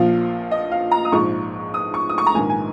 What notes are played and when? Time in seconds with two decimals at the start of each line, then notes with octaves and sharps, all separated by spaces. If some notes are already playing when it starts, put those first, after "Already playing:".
Already playing: A#1 A#2 F3 F5
0.51 D#5
0.72 F5
0.91 A#5
1.05 D#6
1.12 A#1 G#2 F3 G#3 C#6
1.74 D#6
1.94 C#6
2.09 D#6
2.18 C#6
2.27 A#5
2.35 A#1 G#2 D#3 G#5
2.50 G#5